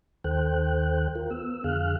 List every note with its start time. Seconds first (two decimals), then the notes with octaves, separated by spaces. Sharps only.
0.24 D#2 D#3 A4 C5 G5 F#6
1.15 F4 A#4
1.30 B3 E6
1.64 F2 D3 G#4 F5 F6 F#6